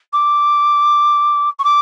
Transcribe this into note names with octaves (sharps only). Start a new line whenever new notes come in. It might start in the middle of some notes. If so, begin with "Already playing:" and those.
D6
C#6
D6